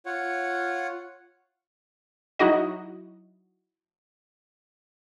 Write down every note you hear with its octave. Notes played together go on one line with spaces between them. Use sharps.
F4 C#5 F#5
F#3 D#4 E4 F#4 D#5